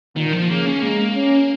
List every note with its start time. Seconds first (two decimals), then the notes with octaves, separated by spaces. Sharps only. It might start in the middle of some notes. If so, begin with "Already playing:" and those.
0.16 A#2 D#3
0.33 F3
0.49 C#3 A#3
0.66 C#4
0.82 G#3 A#3
1.14 C#4